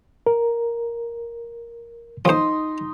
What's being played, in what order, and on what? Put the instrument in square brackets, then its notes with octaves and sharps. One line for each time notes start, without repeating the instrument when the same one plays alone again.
[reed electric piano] A#4
[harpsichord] F3 C5 [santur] D#4 C6 D#6